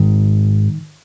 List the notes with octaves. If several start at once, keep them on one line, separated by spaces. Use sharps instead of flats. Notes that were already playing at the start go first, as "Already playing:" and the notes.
Already playing: G#2 D#3